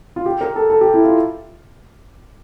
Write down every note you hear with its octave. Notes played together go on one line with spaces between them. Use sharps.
F4
G4
A#4
A4
A4
G4
E4
F4